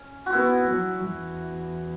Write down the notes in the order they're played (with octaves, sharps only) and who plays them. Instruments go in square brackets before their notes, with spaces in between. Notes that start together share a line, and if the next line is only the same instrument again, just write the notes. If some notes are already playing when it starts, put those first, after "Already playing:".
Already playing: [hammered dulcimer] C#4
F#4
[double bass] B3 [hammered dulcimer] E4
[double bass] F#3
E2